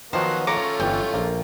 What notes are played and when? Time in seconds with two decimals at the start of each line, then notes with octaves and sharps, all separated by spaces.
0.13 D#3 F3 F#3 B3 D#4 F#4 C5
0.47 A3 C#4 F4 C#5 A#5 D6
0.80 G1 E3 G5
1.14 A#1 A#3